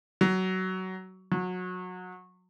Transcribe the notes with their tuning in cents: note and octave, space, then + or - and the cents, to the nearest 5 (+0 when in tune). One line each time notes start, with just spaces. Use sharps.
F#3 +15
F#3 -25